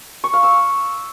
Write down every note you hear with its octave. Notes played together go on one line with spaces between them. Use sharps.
C#6
F5
E6